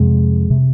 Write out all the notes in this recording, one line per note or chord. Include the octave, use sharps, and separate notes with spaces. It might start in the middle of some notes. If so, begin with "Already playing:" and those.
Already playing: F2 C3 G#3
C3